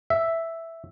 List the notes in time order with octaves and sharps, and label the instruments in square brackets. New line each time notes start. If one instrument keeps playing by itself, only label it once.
[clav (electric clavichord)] E5